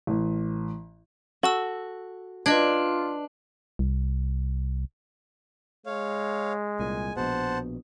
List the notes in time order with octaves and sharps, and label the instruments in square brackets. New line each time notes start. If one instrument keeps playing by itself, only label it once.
[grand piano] A1
[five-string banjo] F#4 [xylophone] A4 A5 E6
[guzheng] D4 [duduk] F4 [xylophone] B4 D#5 G#6
[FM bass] C2
[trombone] G#3 [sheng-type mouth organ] C#5 F5
[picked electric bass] C2 A#2 [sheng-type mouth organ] G#5
[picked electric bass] A#1 B2 [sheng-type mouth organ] C5 F#5 A5